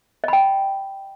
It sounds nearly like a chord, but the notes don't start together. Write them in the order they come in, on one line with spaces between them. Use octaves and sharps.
D#5 B5 G5